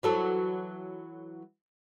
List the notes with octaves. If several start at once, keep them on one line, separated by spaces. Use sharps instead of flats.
E3 F#3 A4